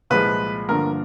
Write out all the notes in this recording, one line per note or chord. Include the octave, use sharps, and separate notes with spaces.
C2 A#2 F3 G#3 B4
G2 D3 F3 A#3 A#4